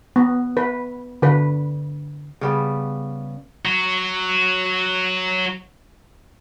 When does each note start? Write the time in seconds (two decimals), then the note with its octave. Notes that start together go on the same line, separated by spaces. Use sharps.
0.16 B3
0.57 B4
1.22 D3 B4
2.41 C#3 G3 B3
3.65 F#3 F#4